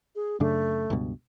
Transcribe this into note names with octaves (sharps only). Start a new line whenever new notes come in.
G#4
F#2 C#3 A3 D4
C#2 G2 B2